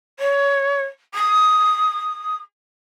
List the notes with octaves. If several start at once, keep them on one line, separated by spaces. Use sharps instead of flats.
C#5
D#6